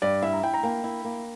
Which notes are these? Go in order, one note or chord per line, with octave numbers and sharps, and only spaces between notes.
G2 D5
E4 E5
A#5
E4 G5
A#5
A#3 G5
E4
A#3